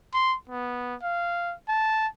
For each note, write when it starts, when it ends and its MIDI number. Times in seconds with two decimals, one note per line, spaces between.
0.14 0.35 84
0.49 0.95 59
1.03 1.54 77
1.68 2.07 81